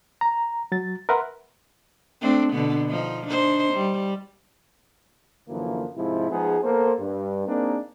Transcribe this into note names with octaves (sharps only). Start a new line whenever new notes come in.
A#5
F#3 A6
A#4 B4 E5 F#5 C6
A3 C4 D4
B2 D3 B3
F3 D#4
D4 D#4 C5
G3
F#2 D3 E3 F3 A#3
G#2 C3 F3 E4
F3 G#3 B3 D#4 G#4
A#3 B3 A4 A#4 C5
G2
A#3 C4 D4 D#4 G#4 A#4